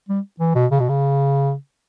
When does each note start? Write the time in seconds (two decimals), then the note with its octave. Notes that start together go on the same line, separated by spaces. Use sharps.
0.09 G3
0.40 E3
0.55 B2
0.71 C#3
0.80 B2
0.89 C#3